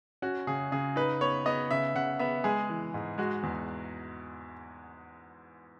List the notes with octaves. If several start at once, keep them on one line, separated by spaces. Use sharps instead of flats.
C#4 F#4
C#3 G#4
C#3 G#4
D#4 B4
B3 C#5
B3 D#5
C#3 E5
C#3 F#5
B3 E5
G#3 G#4
E3
G#2
G#3 F#4
E2